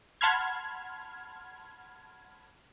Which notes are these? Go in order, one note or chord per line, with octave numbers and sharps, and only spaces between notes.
F#5 A5 B5 C6 F6 G#6